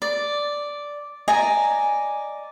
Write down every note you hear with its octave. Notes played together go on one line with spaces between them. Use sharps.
D5
D5 D#5 G#5 A#5